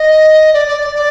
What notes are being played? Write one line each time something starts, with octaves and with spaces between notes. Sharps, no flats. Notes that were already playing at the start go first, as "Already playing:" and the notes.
Already playing: D#5
D5
D5
D5
D5